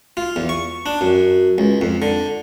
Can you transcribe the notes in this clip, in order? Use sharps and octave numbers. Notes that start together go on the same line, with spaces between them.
F4
E2
C#6
D4
F#2
C#2
F2
D3